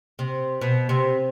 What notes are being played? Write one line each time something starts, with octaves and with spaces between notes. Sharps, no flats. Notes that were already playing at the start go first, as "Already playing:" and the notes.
C3
B2
C3